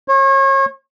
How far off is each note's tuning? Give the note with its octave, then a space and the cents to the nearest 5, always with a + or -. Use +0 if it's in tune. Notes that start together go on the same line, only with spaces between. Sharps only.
C#5 -35